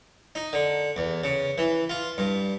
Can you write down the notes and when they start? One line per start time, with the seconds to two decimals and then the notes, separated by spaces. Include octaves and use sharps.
0.35 D#4
0.53 D3
0.96 E2
1.24 C#3
1.58 E3
1.90 F4
2.18 G2